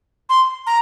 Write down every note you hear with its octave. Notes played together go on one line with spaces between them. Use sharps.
C6
A#5